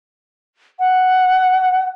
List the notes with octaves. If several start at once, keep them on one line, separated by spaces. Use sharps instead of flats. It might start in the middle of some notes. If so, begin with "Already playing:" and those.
F#5